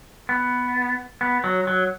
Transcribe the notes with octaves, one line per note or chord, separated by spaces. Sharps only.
B3
B3
F#3
F#3